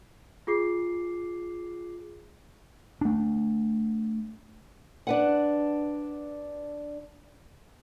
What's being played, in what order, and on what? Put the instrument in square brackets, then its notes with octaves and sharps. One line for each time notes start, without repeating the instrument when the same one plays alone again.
[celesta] F4 G#4 D6 C7
[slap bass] A3 D4
[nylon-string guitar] D4 B4 F#5